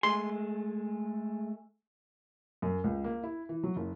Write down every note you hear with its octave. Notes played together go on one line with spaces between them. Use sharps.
G#3 A3 G#4 C6
F#2
C#2
A#3
E4
E3
F#3
F#1